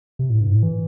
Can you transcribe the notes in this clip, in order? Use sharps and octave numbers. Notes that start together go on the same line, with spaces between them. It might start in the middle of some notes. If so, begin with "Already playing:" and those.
C3
A2
G2
A2
E3